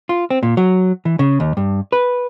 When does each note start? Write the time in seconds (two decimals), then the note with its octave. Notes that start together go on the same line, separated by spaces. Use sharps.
0.09 F4
0.30 C4
0.43 A#2
0.57 F#3
1.05 E3
1.19 C#3
1.40 D#2
1.57 G2
1.92 B4